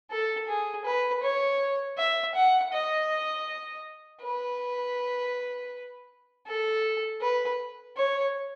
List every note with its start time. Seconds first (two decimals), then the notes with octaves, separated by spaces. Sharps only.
0.11 A4
0.48 G#4
0.85 B4
1.23 C#5
1.98 E5
2.35 F#5
2.73 D#5
4.22 B4
6.47 A4
7.21 B4
7.97 C#5